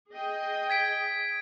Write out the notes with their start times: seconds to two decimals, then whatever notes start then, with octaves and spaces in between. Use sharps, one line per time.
0.13 G#4 D#5 G5
0.70 G#6 B6 D7